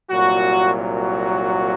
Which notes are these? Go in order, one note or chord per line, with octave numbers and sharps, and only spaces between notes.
C2 A#2 F#3 F#4
F#4